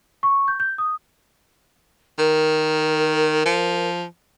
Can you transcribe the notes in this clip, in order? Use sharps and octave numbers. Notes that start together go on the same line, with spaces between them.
C#6
G6
G6
D#6
D#3 A#4
F3